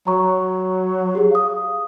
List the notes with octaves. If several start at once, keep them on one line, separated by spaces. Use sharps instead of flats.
F#3 A#5 C#6
G4 G#4
F5 D#6